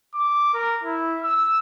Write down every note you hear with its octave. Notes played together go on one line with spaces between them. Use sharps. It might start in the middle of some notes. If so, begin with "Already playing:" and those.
D6
A#4
E4
E6